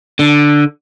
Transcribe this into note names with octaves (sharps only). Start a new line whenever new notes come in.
D3